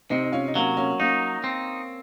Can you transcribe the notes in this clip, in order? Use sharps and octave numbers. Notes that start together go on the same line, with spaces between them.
C3 C4 D#4
D#4
C#4 F4
D#4
F#3 A#3 C#4
A#3 C#4
A#3 C#4 D#4
C4